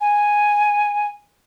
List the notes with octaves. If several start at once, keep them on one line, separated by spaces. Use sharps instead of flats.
G#5